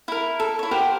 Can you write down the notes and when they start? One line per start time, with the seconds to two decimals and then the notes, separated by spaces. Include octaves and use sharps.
0.08 E4 A#4
0.40 A4
0.59 E4 C#5
0.71 G4 A#4 C5 F#5